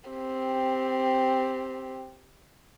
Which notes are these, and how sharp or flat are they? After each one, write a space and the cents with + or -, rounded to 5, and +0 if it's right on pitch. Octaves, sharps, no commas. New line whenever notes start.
C4 +0 G4 +5